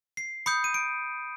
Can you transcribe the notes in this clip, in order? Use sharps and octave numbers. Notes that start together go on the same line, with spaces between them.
C7
B5 D#6 G6 C#7
D#7
D7